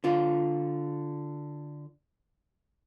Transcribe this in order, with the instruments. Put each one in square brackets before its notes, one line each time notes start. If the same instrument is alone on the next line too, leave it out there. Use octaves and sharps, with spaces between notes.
[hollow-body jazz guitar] D3 F4